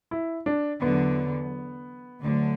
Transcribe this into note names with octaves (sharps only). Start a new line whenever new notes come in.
E4
D4
E2 D3 F#3 B3
D2 D3 F#3